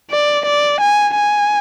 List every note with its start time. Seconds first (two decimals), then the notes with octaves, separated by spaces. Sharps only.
0.11 D5
0.46 D5
0.81 G#5
1.16 G#5